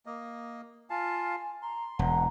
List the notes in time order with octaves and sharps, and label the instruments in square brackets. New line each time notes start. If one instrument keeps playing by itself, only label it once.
[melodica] A#3 D#5
[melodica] F4 F5 A5 [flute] G#5
[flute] A#5 [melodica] C6
[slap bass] E1 [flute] F#5 [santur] A#5